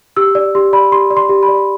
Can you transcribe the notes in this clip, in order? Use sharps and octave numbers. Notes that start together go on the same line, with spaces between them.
G4 E6
D5
G4 C6
D5 B5
G4 C6
D5
C6
G4
B5
D5